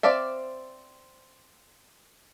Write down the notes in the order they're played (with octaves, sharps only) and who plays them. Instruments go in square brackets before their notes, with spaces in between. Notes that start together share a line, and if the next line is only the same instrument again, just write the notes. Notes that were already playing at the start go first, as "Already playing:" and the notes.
[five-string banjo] C4 D5 E5 F5